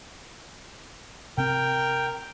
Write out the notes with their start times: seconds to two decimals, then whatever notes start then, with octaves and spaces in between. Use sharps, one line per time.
1.38 C3 C4 A#4 G5